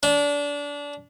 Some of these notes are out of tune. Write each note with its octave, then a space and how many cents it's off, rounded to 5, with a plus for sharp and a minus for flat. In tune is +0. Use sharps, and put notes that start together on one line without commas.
D4 -25